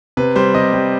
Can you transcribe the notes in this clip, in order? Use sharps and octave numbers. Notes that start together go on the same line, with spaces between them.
C3 B4
G3 C5
C3 D#5
G3